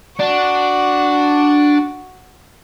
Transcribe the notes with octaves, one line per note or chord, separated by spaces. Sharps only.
D4 F#4